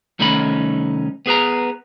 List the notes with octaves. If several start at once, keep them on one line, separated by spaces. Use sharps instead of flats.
C2 D#3 A3 C#4 D#4 B5
B3 G#4 B4 A#5